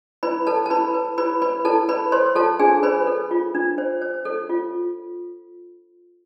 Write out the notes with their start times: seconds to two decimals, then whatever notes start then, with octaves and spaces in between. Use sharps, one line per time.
0.23 E4 B4 B5
0.47 A4 B4 A5
0.66 A5
0.70 E4 B4 B5
0.94 B4
1.18 E4 B4 B5
1.42 B4 B5
1.65 E4 A4 A5
1.89 B4 B5
2.12 A4 C5 C6
2.36 F4 A4 A5
2.59 D4 G#4 G#5
2.83 B4 C5 B5
3.07 A4
3.31 F4
3.55 D4
3.78 C5
4.02 C5
4.25 A4
4.49 F4